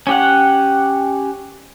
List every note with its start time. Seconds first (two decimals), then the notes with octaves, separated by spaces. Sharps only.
0.07 C#4 G4 F#5